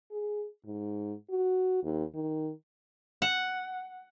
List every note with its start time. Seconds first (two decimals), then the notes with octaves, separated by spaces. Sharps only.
0.11 G#4
0.66 G#2
1.30 F#4
1.83 D#2
2.15 D#3
3.22 F#5